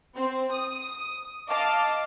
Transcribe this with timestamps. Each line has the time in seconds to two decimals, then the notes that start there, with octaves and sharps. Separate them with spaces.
0.15 C4
0.52 D#6
1.49 D#5 F5 A5 D6